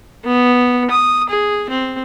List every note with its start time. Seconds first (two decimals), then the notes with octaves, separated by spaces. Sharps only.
0.25 B3
0.91 D#6
1.30 G#4
1.70 C4